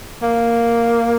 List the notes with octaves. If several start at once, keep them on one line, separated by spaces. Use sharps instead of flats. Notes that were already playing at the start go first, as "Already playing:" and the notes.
A#3